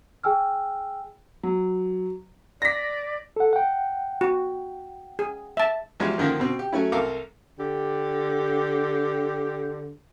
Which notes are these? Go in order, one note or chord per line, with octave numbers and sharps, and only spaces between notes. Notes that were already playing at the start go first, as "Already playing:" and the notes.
G#4 G5 G#5 E6 F6
F#3
D5 A#6 B6
A4 F#5
F#5 G5
F#4
G#4
E5 A5
E2 F3 G3 G#3 F#4 G#4
D3 D#3 F3 A#3
B2 C4
G4
F#3 A3 C#4 E4
C2 A4 A#4 F5 D6
D3 G4